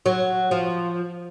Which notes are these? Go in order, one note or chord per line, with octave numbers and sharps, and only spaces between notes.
F#3
F3